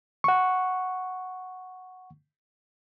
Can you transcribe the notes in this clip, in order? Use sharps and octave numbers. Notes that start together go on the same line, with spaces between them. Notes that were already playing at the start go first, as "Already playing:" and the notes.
F#5 C#6